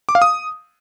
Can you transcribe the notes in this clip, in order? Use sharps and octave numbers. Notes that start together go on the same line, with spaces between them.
D6
F5
D#6